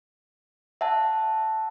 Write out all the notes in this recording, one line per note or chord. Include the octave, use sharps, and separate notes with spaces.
E5 F#5 A5